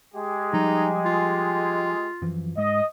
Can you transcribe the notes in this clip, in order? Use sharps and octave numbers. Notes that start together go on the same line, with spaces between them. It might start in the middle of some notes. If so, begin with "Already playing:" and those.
G#3 G4 G#4
F3 G3 D#4
F4
F#2 E3 F3
G#2 G#3 D#5